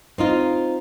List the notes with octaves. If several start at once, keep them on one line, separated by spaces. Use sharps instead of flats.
C4 D#4 F4